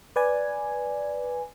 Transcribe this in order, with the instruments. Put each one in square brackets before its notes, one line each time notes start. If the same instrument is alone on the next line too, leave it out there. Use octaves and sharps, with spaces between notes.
[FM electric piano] B4 D5 G#5